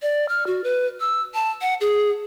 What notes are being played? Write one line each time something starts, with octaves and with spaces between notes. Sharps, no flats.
D5
F6
F#4
B4
E6
A5
F#5
G#4